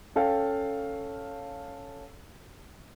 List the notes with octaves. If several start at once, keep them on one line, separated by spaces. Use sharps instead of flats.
C#4 A4 F5 G5